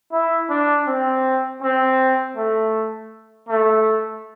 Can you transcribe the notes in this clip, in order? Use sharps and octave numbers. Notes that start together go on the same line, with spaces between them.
E4
D4
C4
C4
A3
A3